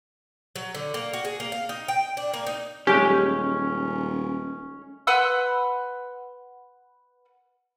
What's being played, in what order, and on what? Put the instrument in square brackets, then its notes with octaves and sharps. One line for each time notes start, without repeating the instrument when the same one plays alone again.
[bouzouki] F#3
D3
A#3
F#4
G#4
A#3
F5
D#4
G5
D4
A#3
D#4
[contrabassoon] D#1 [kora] F#3 G#3 A3 [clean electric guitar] C#4 [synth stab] G4
[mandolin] B4 F#5 C6 E6